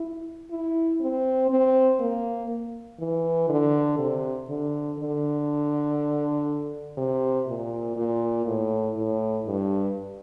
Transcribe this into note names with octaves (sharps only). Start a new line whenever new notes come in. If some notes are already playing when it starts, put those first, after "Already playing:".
Already playing: E4
E4
C4
C4
A#3
E3
D3
C3
D3
D3
C3
A#2
A#2
A2
A2
G2